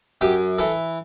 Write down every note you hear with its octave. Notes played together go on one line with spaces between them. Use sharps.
F#2 G4
E3 A4